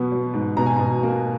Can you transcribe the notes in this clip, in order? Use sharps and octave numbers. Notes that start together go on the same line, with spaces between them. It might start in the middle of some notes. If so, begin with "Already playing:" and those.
Already playing: B2 F#3 B3
F#3
G#2
B2 A#5
G#5
B2 A#5
A#3